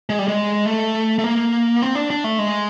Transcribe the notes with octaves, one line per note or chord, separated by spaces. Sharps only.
G#3
G3
G#3
A3
A3
A#3
C4
D4
D4
A3
G#3